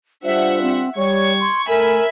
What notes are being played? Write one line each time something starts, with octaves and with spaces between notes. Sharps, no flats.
G3 D4 F4 C5 E5 F#5
C4
G3 C#5 C#6 G#6
C6
A3 A#4 E5 G#5 B5